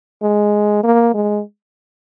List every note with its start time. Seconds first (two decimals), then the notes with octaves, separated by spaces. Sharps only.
0.22 G#3
0.84 A#3
1.14 G#3